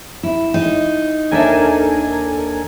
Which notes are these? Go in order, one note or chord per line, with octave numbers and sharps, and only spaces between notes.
E4
D#4
D#2 D4 A4 A#4 E5 G#5